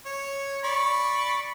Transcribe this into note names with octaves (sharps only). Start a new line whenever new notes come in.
C#5
D5 B5 C#6